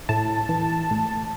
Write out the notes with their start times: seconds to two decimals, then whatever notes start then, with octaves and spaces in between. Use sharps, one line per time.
0.09 A2 A5
0.49 E3
0.91 A2